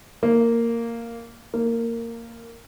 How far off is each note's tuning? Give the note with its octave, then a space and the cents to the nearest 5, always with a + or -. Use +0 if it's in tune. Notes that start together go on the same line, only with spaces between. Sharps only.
A#3 -10
A#3 -15